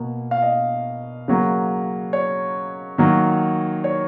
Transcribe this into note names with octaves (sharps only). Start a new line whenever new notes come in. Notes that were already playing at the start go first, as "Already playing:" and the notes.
Already playing: B2 A#3
F5
D#5
C#3 F#3 A#3
C#5
D#3 F#3 A#3
C#5